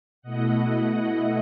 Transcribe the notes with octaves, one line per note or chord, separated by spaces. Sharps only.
B2 A3 E4 D#5 F#5